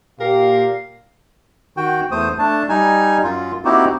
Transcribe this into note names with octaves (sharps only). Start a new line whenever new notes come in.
A#2 G4 A#4 F5
D#3 F#4 G5
E2 A3 C5 D#6
A3 D4 A5
G3 D#4 G#5
F#2 F4
A#3 C4 D#4 E4 F#4 G4